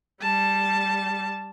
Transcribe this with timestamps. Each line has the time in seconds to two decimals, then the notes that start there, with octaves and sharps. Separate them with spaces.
0.22 G3 A5